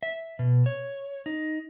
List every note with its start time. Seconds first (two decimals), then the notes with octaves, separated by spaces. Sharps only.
0.03 E5
0.39 B2
0.66 C#5
1.26 D#4